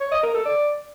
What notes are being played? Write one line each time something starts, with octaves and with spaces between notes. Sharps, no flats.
C#5
D#5
A#4
A4
D5